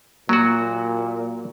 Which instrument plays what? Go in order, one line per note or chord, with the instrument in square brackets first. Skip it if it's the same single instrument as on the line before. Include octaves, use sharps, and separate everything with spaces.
[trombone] A#2 [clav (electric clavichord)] F#3 F#4 [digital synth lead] A#3